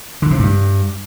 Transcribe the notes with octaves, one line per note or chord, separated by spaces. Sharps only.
D3
C3
G2